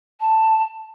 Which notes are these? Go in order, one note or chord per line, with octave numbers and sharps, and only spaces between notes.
A5